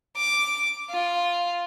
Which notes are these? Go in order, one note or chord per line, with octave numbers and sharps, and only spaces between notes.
D6
F4